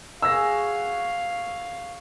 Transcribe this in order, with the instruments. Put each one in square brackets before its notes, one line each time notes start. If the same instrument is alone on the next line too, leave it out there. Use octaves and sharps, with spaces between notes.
[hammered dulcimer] F#4 G#4 C#5 [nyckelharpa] F5 [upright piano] E6 A#6